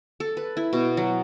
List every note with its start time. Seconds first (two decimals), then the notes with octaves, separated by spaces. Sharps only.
0.20 A4
0.37 B4
0.57 E4
0.73 B2
0.97 F#3